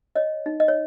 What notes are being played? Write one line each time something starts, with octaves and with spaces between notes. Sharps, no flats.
C#5 D#5
D#4
D#5
C#5